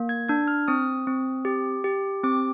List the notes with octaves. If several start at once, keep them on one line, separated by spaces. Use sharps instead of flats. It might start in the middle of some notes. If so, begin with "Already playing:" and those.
Already playing: A#3
G#6
D4 G#6
F6
C4 D#6
C4
G4
G4
C4 D6